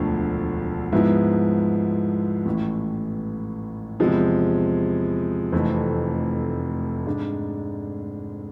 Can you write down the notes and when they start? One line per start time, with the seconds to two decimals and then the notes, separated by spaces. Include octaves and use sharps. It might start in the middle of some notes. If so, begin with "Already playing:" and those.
Already playing: E1 D2 D3 F3 A3
0.92 G#2 F3 G#3 B3 E4
2.46 A1 A2 E3
4.00 E2 C3 F3 G#3
5.52 F1 F2 E3 A3 C4
7.06 G#2 G#3 D4